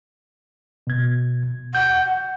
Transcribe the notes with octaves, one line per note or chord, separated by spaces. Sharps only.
B2 G#6
F#5 G6